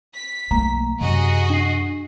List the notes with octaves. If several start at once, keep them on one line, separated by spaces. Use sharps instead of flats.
B6
B1 A3 A#3 A#5
F#2 C3 F#3 F#4 G#4 D#5
D4 C7